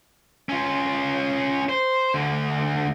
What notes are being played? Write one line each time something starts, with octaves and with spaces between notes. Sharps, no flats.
C#4 F4
C5
D2 D3